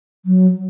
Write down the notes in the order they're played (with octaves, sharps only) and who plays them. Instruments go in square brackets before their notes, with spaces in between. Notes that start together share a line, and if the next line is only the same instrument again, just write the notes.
[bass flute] F#3